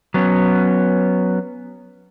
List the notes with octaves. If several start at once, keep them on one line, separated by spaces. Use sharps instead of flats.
F#3 B3 C#4